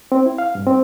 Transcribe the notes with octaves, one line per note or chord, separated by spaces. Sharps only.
C4
E4
F5
G2
C4